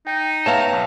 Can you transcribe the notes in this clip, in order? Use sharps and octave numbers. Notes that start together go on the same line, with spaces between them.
D#4 G5
B3 C#5 E5 F5 G5 A5 A#5
B1